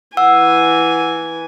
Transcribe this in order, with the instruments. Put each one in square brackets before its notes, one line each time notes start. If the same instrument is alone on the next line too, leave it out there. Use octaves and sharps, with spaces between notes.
[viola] E3 G#5 [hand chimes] F#5 E6